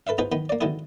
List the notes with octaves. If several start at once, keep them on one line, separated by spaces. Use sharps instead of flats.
A4 B4 E5 F5
B3 D#4 F4 G#4 B4 C5
D#3 B3 B5
A#3 D5
B2 D3 D#3 G#3 E4 G#4